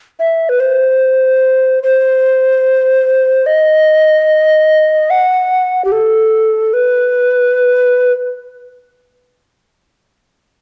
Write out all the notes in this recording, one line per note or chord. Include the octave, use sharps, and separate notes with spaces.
E5
B4
C5
C5
D#5
F#5
G4
A4
B4